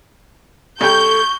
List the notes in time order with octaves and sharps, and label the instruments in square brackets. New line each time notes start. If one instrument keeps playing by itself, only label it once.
[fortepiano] C2 G5 [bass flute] A4 [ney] C#6 [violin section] G6